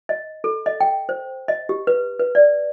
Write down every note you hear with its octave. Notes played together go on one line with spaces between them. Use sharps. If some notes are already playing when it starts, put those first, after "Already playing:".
D#5
A4
D#5
G5
C5
D#5
G4
B4
B4
D5